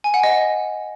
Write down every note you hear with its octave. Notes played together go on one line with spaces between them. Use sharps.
G#5
F#5
D#5